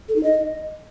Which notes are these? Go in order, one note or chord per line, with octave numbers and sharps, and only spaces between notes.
A4
D#4
D#5